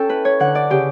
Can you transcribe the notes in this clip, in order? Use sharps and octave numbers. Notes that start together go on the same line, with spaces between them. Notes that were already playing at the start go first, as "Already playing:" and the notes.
Already playing: C#4 A4 G5
E4 B4
C#5
D3 F#5
D5
C#3 G4